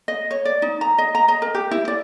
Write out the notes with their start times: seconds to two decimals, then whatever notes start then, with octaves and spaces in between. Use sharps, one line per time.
0.08 D#5
0.31 C#5
0.45 D5
0.62 D#4
0.81 A#5
0.98 D#5
1.15 A#5
1.28 D#5
1.42 A#4
1.55 G4
1.71 E4
1.88 D5